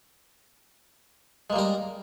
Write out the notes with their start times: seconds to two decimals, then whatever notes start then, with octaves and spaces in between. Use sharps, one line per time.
1.50 G#3
1.53 A#3
1.56 G3
1.59 A#4